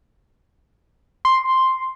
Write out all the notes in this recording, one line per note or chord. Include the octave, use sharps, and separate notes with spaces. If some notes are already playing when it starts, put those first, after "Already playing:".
C6